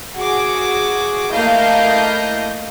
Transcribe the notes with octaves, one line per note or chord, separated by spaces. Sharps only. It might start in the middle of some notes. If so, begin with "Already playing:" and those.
F#4 G#4 D6
A3 A#3 E4 D#5 F5 G6